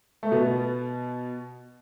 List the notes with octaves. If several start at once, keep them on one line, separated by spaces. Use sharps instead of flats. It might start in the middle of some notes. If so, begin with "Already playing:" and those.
A3
B2 B3